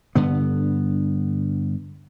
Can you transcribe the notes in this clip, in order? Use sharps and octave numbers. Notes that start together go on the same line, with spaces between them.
G2 D3 B3